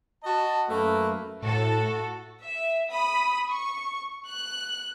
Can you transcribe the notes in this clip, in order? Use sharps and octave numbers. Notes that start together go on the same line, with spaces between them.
F#4 D#5 A5
F#2 A3 A#3 B4
A2 F#4 A4
E5
B5 D#6
C#6
F#6